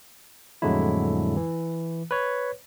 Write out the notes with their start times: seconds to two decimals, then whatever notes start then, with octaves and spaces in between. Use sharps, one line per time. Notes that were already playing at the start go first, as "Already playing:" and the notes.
0.62 F2 A2 D3 F#3 G#3 E4
1.37 E3
2.11 B4 C#5